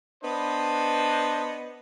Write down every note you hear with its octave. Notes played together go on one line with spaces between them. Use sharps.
B3 D4 B4 C5 D#5